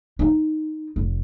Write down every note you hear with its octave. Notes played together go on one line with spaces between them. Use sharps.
D#4
F1